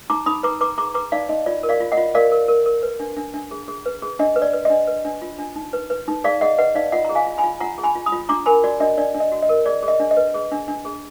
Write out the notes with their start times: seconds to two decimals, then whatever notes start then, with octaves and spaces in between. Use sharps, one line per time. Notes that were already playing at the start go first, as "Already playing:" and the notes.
0.10 D#4 A#5 D6
0.26 D#4 B5 D#6
0.43 B4 A#5 D6
0.61 B4 A#5 D6
0.78 G#4 A#5 D6
0.94 B4 A#5 D6
1.12 D#4 D5 F5
1.29 D#4 D#5
1.46 F4 D5
1.63 A#4
1.69 D5 F5
1.80 F4
1.92 D#5 F#5
1.97 F4
2.15 A#4 D5 F5
2.32 A#4
2.48 A#4
2.66 A#4
2.83 B4
3.00 D4
3.17 D4
3.34 D4
3.51 G#4
3.68 G#4
3.86 B4
4.02 G#4
4.19 D4 D#5
4.36 B4
4.42 D5
4.53 B4
4.65 D4 D#5
4.87 B4
5.05 D4
5.22 F4
5.39 D4
5.56 D#4
5.73 B4
5.90 B4
6.08 D#4
6.24 G#4 D5 F5
6.41 G#4 D#5 F#5
6.58 B4 D#5 F#5
6.75 D#4 D5 F5
6.92 F4 D#5 F#5
7.05 G#4 A#5
7.15 F5 G#5
7.26 F4
7.38 G#5 B5
7.44 F4
7.60 F4 F#5 A#5
7.78 G#4
7.84 G#5 B5
7.95 F4
8.06 B5 D#6
8.12 F4
8.29 D4 A#5 D6
8.46 A#4 G#5 B5
8.63 F#4 D5
8.80 D4 D#5
8.98 D4 D5
9.14 D4
9.20 D#5
9.32 F#4
9.43 D#5
9.49 A#4
9.66 G#4 D5
9.83 G#4
9.88 D#5
10.00 D4
10.11 D#5
10.17 B4
10.34 G#4
10.52 D4
10.68 D4
10.85 G#4